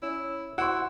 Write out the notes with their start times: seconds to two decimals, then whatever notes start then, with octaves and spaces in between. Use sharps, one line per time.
0.02 C#4 E4
0.58 E4 F#4 C5 F#5